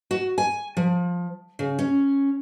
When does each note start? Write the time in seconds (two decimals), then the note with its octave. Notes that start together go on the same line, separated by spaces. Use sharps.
0.11 F#4
0.38 G#5
0.77 F3
1.59 C#3
1.79 C#4